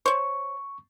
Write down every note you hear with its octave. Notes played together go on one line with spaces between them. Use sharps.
C5 C#5 C#6